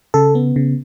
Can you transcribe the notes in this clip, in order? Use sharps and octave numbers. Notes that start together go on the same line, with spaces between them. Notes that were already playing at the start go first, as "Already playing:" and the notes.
C#3 A4
B3
C#3